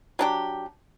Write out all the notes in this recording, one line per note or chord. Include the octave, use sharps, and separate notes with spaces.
F#3 D4 G4